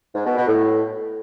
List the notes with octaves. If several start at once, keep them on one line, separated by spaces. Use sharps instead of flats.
G#2
B2
B2
A2